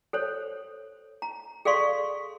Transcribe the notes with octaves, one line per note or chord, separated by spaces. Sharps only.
A4 C5 C#5
A#5
G#4 A4 D5 F5 C6 C#6